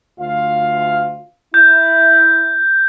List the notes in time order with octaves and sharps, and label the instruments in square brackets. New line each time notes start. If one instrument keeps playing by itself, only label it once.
[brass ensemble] D2 F4 F5
[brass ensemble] E4 [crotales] G6